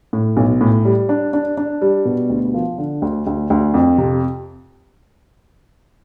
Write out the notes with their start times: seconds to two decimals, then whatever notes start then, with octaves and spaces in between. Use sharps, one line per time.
0.13 A2
0.37 B1
0.61 A2
0.85 G3
1.09 D4
1.33 D4
1.57 D4
1.81 G3
2.05 B2
2.30 D2
2.54 F3
2.78 D3
3.02 D2
3.27 D2
3.50 D2
3.74 F2
3.98 C3